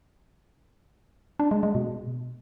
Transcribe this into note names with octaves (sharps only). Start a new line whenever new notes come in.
D4
G#3
G#3
B2